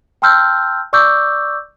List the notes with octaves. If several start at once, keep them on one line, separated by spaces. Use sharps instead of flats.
G5 A5 C6 E6 F6 G6
D5 C#6 D6 E6 G6